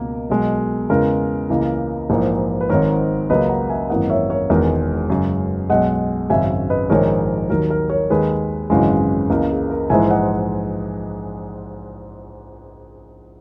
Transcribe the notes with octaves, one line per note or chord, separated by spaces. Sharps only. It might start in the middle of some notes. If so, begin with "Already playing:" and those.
Already playing: C#2 B2 A#3 A#4
B1 B2 G#3
E2 C#3 E3 G#3 A#4
C#2 C#3 E3 A#3
A#1 G#2 E3 A#3
B4
G#1 G#2 D#3 A#4 C#5
C#2 C#3 F#3 A#3 B4 D#5
F#5 A#5
E5 G#5
G#1 F#2 E3 A#3 D#5 F#5
C#5 E5
A#4 C#5
E1 E2 D#3 G#3 A#4
F#2 C#3 G#3
B1 B2 G#3 D#5 F#5
G#1 F#2 C#3 G#3 E5 G#5
B4 D#5
A#1 G#2 D#3 G#3 A#4 C#5
D#2 D#3 F#3 A#4
A#4
A#4 C#5
D#2 D#3 G#3 G#4 B4
G#1 F#2 C#3 E3 G#3
C#2 C#3 E3 A#3 A#4
G#4
A#4
A#1 G#2 E3 G#3 E5 G#5
D#5 F#5